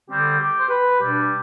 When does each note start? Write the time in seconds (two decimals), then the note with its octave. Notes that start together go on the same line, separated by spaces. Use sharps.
0.09 D3 G3 C4 G4
0.39 G4
0.59 C5
0.69 B4
1.00 B2 G3 D4 G4